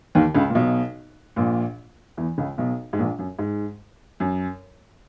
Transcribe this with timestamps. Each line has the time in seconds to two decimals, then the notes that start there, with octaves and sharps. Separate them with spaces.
0.15 D#2 D#3
0.35 C#2 C#3
0.50 A#2
0.55 B1 B2
1.36 A#1 A#2
2.17 E2 E3
2.38 C#2 C#3
2.58 B1 B2
2.93 G#2
2.99 A#1 A#2
3.19 F#2
3.39 G#2
4.20 F#2